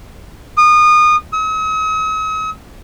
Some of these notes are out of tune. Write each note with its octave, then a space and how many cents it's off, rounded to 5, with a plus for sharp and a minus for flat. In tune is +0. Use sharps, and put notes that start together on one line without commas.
D#6 -30
D#6 +45